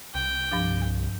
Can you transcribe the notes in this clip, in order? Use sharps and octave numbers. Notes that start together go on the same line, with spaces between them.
C2 G5
G2 F3 D4